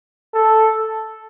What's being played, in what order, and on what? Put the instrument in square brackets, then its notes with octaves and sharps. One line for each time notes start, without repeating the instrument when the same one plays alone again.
[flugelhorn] A4